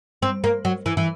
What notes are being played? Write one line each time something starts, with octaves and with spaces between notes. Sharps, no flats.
C4
A#3
F#3
E3
E3